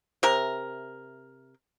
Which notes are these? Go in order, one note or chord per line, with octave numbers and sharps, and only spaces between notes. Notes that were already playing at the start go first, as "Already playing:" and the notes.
C3 A#4